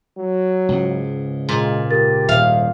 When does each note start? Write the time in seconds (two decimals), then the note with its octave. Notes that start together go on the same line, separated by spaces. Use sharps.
0.18 F#3
0.69 C#2 G#2
1.49 A#2 G#3
1.91 G4 A#4 A6
2.29 D#1 G#2 E5 F5